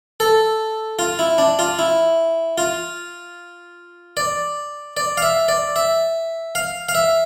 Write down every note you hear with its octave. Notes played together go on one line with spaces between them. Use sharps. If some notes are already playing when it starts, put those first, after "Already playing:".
A4
F4
E4
D4
F4
E4
F4
D5
D5
F5
E5
D5
E5
F5
F5
E5